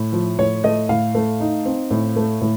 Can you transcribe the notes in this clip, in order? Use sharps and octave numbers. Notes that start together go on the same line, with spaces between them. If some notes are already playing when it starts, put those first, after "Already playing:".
Already playing: A2
F3
A2 C#5
A3 D#5
A2 F5
A3
D#4
C4
A2
A3
A2